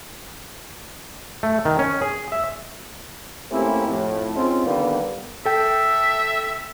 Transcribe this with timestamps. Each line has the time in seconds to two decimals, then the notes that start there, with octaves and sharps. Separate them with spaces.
1.43 A3
1.65 D#3
1.79 C#4
2.02 G#4
2.32 E5
3.51 A3 A#3 C4 C#4 E4 G4
3.87 F2 A2
4.35 C#3 C4 C#4 D#4 F4
4.66 D3 D#3 G3 A#3 B3
5.45 A4 E5 G5